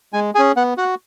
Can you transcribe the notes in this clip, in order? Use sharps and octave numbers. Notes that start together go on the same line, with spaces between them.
G#3 G#5
C#4 G#4 G#5
B3 F#5
F#4 F#5